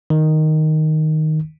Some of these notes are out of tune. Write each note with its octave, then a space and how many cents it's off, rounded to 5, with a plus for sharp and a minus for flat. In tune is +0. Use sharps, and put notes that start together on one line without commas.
D#3 +0